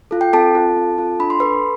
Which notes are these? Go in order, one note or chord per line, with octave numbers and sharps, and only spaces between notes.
F4 A4
G5
C4 A4 A5
F4 A4
C4
F4 A4
D4 B5
C6
A4 B4 B5